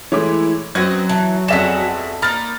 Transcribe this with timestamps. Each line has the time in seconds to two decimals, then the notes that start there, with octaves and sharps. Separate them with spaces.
0.12 E3 G#3 A3 E4 C#5 D6
0.75 F#2 F#3 C4 F#4 B4 D#5 G#6
1.09 E3 A5
1.48 F2 G#3 B3 F#4 D5 E5 B6 E7
2.22 A#3 D#4 B5 F6 A6